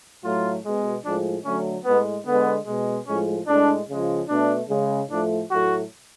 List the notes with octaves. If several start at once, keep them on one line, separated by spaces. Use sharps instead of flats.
A2 F#3 A3 F4
B2 G#3
A2 F3 G#3 D4
D3 F#3 A3 C#4
A2 G#3 B3
D3 G#3 B3
B2 G#3
A2 F3 G#3 C#4
A2 G#3 D4
C#3 F3 G#3
B2 A3 D4
C#3 G#3
A2 F3 A3 D4
A2 F#3 A3 F#4